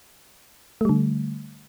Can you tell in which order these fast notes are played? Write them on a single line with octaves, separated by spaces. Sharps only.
A3 G3 D3